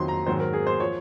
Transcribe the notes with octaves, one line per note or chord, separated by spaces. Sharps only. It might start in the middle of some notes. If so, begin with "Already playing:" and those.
Already playing: F2 D#3 F#3 C6
A#5
G#2 D#3 F#3 C5
A#4
G#4
C5
F3 C#5